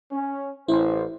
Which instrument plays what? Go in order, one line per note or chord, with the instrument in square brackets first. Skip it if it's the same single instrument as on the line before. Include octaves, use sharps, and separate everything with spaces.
[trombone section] C#4
[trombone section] A1 C5 [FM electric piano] E4